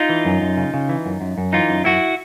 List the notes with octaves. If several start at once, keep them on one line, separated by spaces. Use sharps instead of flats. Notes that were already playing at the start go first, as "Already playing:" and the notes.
Already playing: D#4 F4
E3
F#2
F#2
C#3
C#3
E3
F#2
F#2
F#2
E3 D#4 F4
F#2
F#2 E4 F#4